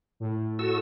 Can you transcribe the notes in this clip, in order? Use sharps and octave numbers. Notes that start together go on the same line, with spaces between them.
A2
F#4 A4 E6